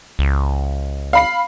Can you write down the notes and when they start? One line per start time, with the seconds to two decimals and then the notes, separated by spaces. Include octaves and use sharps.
0.19 C#2
1.13 F5 B5 C7